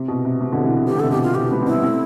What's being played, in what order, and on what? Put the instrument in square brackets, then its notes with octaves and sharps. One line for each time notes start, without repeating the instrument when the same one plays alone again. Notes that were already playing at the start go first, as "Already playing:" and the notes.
Already playing: [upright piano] C3
B2
C3
C3
B2 D3
C3 E3
[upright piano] E3 [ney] G4
[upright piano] D3
[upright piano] C3 [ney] A4
[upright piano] B2 D3 [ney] G4
[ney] F4
[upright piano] C3 E3 [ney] G4
[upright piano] G3 B3
C4
[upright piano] G3 B3 [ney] E4
[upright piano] A3 C4